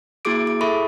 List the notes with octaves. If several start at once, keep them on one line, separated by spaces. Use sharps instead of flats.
A#3 E4 F#4 G#4 D6 D7
D6
E4 G#4 A4 E5 B5 C#6